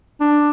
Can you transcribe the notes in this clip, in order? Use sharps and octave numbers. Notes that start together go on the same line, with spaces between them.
D4